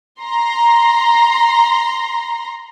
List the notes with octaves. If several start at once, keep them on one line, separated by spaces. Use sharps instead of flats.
A#5 C6